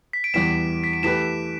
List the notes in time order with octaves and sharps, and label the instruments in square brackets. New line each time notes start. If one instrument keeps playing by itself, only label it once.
[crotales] B6
D7
[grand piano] E2 E3 G3 B3 [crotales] B6 E7
[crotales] B6
D7
[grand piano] E3 A3 G4 B4 [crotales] B6 E7